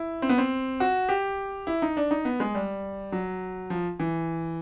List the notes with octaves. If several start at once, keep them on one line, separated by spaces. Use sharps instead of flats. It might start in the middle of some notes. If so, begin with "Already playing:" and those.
Already playing: E4
C4
B3
C4
F#4
G4
E4
D#4
D4
D#4
B3
G#3
G3
F#3
F3
E3